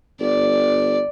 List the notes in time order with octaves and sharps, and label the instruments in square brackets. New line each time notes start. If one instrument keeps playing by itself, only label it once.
[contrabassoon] G1 [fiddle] D5